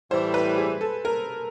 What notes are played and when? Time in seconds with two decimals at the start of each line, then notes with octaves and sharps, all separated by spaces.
0.11 A2 E3 G3 C5
0.34 B4
0.58 G#4
0.81 A4
1.05 A#4